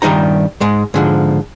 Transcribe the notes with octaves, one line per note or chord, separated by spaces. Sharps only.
G2 D#3 G3 D#4 A#5
G#2 G#3
G#2 D3 F3